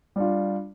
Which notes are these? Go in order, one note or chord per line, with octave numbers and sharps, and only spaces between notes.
G3 D4 F4